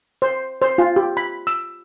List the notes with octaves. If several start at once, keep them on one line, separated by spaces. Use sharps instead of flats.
C5
C5
F4
G4
B5
E6